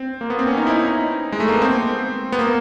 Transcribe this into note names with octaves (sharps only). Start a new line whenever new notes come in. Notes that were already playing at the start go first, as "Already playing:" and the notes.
Already playing: C4
A#3
B3
C4
C#4
D#4
E4
D#4
G#3
A3
A#3
B3
C4
B3
A#3